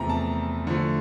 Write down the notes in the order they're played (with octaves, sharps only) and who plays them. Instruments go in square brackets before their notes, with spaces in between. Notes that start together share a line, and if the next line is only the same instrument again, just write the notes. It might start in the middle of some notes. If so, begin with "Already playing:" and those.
Already playing: [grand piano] E2 C3 F3 A3 A#5
A5
D3 F3 A3